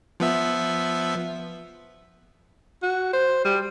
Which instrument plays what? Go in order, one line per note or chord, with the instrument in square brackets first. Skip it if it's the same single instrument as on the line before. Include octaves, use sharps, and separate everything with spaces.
[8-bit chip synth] F3 B3 E5
[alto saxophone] F#4
C5
G3